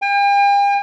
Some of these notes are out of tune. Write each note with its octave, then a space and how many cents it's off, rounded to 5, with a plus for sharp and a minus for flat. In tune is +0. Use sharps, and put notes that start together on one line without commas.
G5 +45